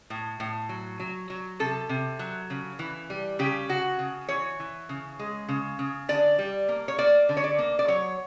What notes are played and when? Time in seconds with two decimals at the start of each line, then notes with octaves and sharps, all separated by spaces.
0.10 A2
0.40 A2
0.69 F#3
1.00 F#3
1.30 F#3
1.59 C3 A4
1.89 C3
2.19 F#3
2.50 C#3
2.79 E3
3.10 G3
3.39 C#3 G4
3.69 C#3 F#4
3.99 C#3
4.29 E3 C#5
4.60 E3
4.89 C#3
5.19 G#3
5.49 C#3
5.79 C#3
6.09 D3 D5
6.39 G3
6.69 A#3
6.88 C#5
6.98 A#3 D5
7.29 D3
7.37 C#5
7.44 D5
7.59 A#3
7.79 D5
7.88 F#3 C#5